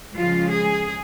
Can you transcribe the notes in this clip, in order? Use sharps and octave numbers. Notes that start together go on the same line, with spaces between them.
C#3 F3 G#3 F4
G#4